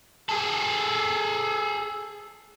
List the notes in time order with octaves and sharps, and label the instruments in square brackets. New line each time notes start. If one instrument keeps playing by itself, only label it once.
[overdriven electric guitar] G#4 A4